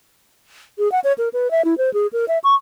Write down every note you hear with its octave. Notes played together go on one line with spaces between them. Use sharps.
G#4
F#5
C#5
A#4
B4
E5
E4
C5
G#4
A#4
E5
C#6